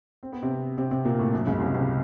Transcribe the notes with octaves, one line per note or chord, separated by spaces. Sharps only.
C4
B3
C3 C4
C3 C4
C3 C4
A#2 A#3
A2 A3
F#2 F#3
C#2 C#3
C2 C3
C2 C3